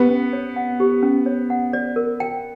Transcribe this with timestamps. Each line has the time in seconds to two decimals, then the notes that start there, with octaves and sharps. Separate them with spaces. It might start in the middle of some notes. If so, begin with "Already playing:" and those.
Already playing: B3 G4
0.09 C#4
0.33 C#5
0.56 F#5
0.80 G4
1.03 C#4
1.26 C#5
1.50 F#5
1.73 D5
1.96 A#4
2.20 G5